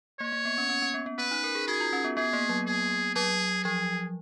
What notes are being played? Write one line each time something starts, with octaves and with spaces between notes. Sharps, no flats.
A#3 C#5
A#3
B3
C#4
C#4
C#4
B3
B3
C#4 B4
D#4
A#4
G#4
F#4 G#4
F4
C#4
B3
B3 G#4
A#3
F#3
G#4
F#3 G#4
F3 G#4